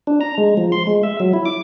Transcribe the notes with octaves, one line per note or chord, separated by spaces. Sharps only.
D4
A#5
G#3
F3
C6
G#3
E5
F#3
E4
D6